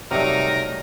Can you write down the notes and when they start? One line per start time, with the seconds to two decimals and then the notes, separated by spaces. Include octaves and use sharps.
0.11 C3 F#3 G3 A3 D#4 A#4